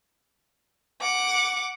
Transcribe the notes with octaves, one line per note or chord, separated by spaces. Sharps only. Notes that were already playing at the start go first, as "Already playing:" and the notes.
F#5 D6